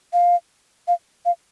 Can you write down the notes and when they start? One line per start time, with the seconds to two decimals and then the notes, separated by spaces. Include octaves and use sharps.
0.13 F5
0.88 F5
1.25 F5